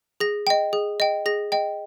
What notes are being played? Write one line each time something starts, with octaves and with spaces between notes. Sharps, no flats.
G#4 A#6
D#5 G5
G#4
D#5 G5
G#4 A#6
D#5 G5